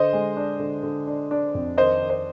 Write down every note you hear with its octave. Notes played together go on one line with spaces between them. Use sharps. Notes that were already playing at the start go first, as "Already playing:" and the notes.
Already playing: D3 C5 D#5
G#3
D4
D3
D3
D4
D4
F2
D#3 C5 D#5
D#3
C5